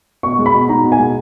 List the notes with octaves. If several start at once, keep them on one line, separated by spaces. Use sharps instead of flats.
B2 C#6
G#3
B5
B2
D#4 A#5
B2
G#5
G#3